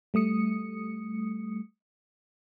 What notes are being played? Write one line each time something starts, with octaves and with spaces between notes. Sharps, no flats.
G3 A3 D#6 C#7